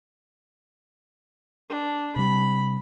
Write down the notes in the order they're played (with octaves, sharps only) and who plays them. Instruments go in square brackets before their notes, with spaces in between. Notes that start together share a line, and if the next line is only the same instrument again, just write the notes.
[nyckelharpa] D4
[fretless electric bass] C3 G3 [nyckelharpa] B5